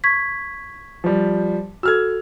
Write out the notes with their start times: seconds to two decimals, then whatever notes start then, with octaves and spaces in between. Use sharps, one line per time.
0.04 C#6 G#6 B6
1.04 F3 G3
1.83 F#4 A4 E6 F6 G#6